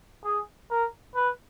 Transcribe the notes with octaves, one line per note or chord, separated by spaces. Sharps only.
G#4
A#4
B4